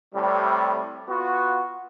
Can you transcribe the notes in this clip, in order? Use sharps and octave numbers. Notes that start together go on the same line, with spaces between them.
A2 C3 G3
B3 F4 F#4